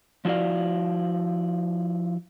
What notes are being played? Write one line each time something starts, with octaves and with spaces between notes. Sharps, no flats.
F3 D4 E4 F#4 D5 F5